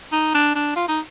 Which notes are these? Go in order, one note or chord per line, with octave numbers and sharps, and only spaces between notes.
D#4
D4
D4
F4
D#4